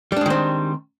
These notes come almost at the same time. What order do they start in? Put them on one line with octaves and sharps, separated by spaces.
G3 D4 G#3 D#3 C4